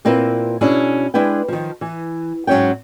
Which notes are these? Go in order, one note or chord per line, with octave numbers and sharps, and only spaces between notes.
A#2 C4 E4 F4 A#4 B4
B2 C#4 D4 E4 G#4
G#3 D4 E4 B4 G5
D#3 F3
E3
G#2 F#3 C#4 C#5 G5